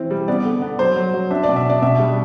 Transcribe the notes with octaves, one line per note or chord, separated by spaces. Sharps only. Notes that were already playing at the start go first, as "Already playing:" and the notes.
Already playing: E3 C4
G3
B3 D5
D3
B3
F#3 C5
F#3
F#3
D4 E5
B2 D5
E5
D4 D5
B2 E5
G3